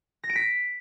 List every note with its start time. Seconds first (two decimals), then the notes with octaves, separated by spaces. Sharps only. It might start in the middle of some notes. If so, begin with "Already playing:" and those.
0.24 A#6
0.30 D7
0.36 B6